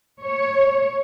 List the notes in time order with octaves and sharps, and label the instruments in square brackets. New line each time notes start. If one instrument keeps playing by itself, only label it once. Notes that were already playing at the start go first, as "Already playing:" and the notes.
[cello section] C#5